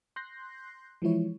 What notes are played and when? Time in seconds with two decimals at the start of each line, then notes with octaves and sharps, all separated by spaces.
0.16 C6 F#6 G6 A#6 C7
1.02 E3 F3 G#3 E4 C#5